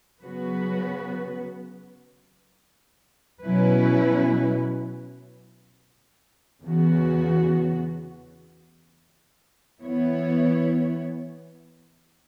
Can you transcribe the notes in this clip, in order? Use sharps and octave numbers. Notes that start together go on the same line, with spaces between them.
C#3 F#3 B3 F#4 B4
B2 F#3 C#4 E4 B4
E2 C#3 E3 B3 F#4
E3 B3 E4 C#5